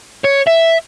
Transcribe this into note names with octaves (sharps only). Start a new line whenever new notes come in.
C#5
E5